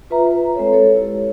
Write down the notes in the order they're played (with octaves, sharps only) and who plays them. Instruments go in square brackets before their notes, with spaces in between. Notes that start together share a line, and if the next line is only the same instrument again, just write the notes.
[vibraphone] F4 B4 E5 A#5
B4 E5
G#3 C4 A4 C#5
A4 C#5
E4 G4